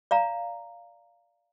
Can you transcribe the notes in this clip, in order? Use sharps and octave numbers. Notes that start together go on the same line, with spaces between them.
D5 F5 A#5